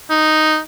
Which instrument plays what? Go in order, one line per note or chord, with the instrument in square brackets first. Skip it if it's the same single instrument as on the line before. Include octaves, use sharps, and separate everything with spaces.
[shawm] D#4